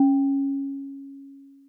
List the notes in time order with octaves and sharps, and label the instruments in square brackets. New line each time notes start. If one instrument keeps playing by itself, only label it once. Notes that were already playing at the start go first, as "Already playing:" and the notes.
Already playing: [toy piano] C#4